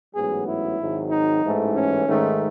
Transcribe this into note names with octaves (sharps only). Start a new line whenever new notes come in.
A1 G#2 F#3 B3 G#4
E4
G#1 G#2 D#3 F#3
D#4
A1 G#2 E3 A3
C#4
G#2 D#3 A3